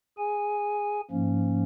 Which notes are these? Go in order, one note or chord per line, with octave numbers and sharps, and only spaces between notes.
G#4 G#5
G#2 F3 A#3 C#4